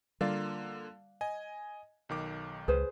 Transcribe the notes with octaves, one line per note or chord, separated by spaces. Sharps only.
D3 G3 A#3 F4 D5 F5
D#5 G#5
B1 D#3 D6
C#2 G#4 B4 C5